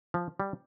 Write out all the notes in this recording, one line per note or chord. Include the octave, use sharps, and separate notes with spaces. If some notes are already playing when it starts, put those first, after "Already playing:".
F3
G3